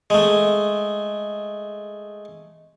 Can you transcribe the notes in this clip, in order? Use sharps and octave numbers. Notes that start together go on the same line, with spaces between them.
G#3 A3